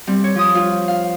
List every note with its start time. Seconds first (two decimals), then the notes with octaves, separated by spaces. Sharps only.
0.07 G3 C4
0.24 C#5
0.35 F3 D#6
0.55 F4
0.88 F5